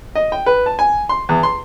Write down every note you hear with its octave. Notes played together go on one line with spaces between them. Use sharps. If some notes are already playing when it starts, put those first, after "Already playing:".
D#5
G5
B4
A5
G#5
C6
E2
C6